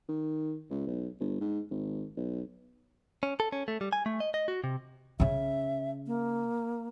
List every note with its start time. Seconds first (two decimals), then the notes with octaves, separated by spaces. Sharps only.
0.08 D#3
0.70 C#2
0.87 B1
1.20 G1
1.41 G#2
1.70 G#1
2.17 B1
3.23 C#4
3.40 A4
3.52 C#4
3.68 A3
3.81 G3
3.93 G#5
4.06 A3
4.20 D#5
4.34 D#5
4.48 F#4
4.64 C3
5.20 C#3 C#4 E5
6.07 A#3